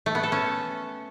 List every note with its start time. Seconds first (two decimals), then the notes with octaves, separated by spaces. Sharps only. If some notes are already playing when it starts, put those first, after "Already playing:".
0.06 A3
0.15 B3
0.23 A4
0.32 C#4